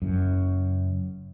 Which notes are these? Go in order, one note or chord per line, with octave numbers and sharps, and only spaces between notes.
F#1 F#2